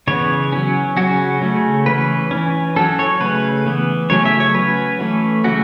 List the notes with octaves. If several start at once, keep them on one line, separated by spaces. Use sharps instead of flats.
C#3 E3 B3 C#5
F#3 C#4
C#3 F#3 C#4 F#4
C#3 A3 C#4
E3 C#4 B4
E3 C#4
F#3 C#4 A4
C#5
C#3 A3 C#4 B4
E3 B3
C#3 F#3 A3 C#4 C#5
E5
C#5
F#3 C#4 B4
E3 A3 C#4
C#3 F#3 A3 C#4 F#4